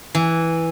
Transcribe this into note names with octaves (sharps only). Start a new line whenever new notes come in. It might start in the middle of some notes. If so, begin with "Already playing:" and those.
E3